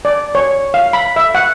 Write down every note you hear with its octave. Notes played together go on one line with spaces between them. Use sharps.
D5
C#5
F5
B5
E5
F#5